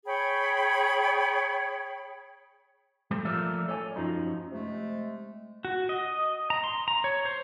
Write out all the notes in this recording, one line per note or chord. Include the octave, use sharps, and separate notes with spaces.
G#4 C#5 G5 B5
G3 A3 G4 C5
F3 A3 A#3 A#4 D5 E5
A4 C#5 D5 G#5
F#2 F3 F#3 D#4
C3 G#3 A3
F#4
D#5
A#5
C6
A#5
C#5
C5